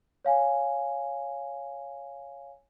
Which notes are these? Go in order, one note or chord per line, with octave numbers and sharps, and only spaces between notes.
C#5 F5 G#5